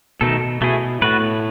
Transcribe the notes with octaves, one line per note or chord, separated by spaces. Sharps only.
B2 D#3 A3 D#4 A4
B2 A3 E4 G#4
A2 B3 F#4 B4